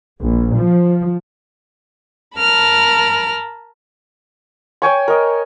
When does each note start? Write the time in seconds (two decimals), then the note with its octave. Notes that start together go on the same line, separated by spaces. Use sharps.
0.19 A#1
0.57 F3
2.38 A#4 A5 B5 F6
4.82 C#5 G5 G#5 C#6
5.08 A#4 D#5